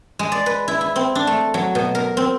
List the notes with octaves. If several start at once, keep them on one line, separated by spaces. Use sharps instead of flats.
G#3
D5
B4
E4
E4
C4
D4
A3
F#3
B2
A#4
C4